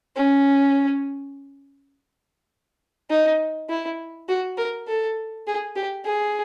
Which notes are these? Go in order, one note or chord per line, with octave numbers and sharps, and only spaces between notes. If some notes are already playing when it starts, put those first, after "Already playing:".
C#4
D#4
E4
F#4
A#4
A4
G#4
G4
G#4